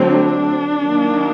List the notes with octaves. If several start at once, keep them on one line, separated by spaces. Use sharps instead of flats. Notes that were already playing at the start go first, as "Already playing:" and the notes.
Already playing: D3 F#3 A3 C4
D4
D#3 F#3 A#3